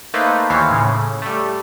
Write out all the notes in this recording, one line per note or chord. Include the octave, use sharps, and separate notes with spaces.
A3 A#3 D#4 B4 C5
D#2 E3 C5 C#5 F5 B6
A2 C#3
G3 A3